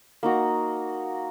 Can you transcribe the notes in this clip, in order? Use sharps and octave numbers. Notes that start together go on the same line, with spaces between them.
A#3 D#4 F#4